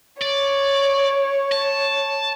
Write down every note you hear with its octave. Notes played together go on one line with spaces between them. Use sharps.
C#5 D5
A5